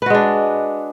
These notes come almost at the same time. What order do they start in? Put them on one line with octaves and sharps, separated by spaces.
B4 F#4 G#3 D4